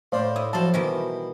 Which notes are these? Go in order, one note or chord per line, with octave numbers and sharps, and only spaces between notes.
A2 D4 C5 D5 F5
E4 D#6
F3 F#3 A4 C5 A5
B2 D#3 E3 G3